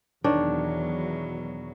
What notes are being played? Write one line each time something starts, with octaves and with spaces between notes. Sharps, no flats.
E2 B2 D#3 F#3 D4 C#5